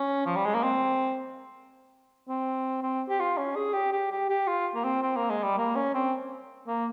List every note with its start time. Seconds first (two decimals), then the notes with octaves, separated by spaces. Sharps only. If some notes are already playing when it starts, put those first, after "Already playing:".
Already playing: C#4
0.26 F3
0.36 G3
0.45 G#3
0.54 A#3
0.63 C4
2.28 C4
2.83 C4
3.09 G4
3.20 F4
3.37 C#4
3.56 G#4
3.74 G4
3.92 G4
4.11 G4
4.30 G4
4.47 F4
4.75 A#3
4.84 C4
5.02 C4
5.16 A#3
5.30 G#3
5.43 G3
5.58 A#3
5.76 C#4
5.94 C4
6.67 A#3